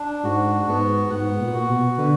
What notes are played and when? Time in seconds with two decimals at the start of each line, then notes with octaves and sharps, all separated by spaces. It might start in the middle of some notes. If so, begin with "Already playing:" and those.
Already playing: D4
0.23 G#2 F#4
0.67 G#2 B3
1.10 G#2 F#5
1.40 A#2
1.54 F#4
1.69 B2
1.97 D3 B4